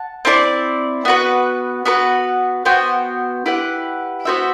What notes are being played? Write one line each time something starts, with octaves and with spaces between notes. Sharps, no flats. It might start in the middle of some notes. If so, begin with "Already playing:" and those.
Already playing: F#5 A5
C4 E4 A4 D5
B3 F#4 B4
B3 F#4 B4
B3 F#4 C5 G5
E4 G4 B4 F#5
B3 F#4 C5 E5